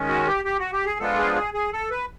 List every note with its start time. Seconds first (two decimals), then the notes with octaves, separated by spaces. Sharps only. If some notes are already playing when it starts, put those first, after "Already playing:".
Already playing: D#3 G#3 C#4
0.08 F#4
0.28 G4
0.45 G4
0.59 F#4
0.73 G4
0.86 G#4
0.99 F3 G#3 B3 D4 F4 A4
1.18 G#4
1.36 G#4
1.54 G#4
1.73 A4
1.91 B4